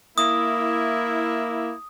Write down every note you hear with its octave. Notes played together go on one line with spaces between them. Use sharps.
A#3 E4 D#6